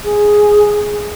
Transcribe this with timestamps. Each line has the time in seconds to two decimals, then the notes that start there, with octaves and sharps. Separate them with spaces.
0.04 G#4